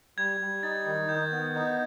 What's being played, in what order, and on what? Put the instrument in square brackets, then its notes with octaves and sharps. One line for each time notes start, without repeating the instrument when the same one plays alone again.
[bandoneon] G3 [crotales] G#6
[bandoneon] G3
[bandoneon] D#4 [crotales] A6
[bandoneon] D#3
[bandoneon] D#3 [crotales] G6
[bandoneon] B3
D#4